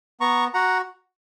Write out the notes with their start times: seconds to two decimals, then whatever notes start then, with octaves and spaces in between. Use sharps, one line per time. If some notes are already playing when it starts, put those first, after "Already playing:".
0.20 B3 A#5 C#6
0.54 F#4 F#5 A#5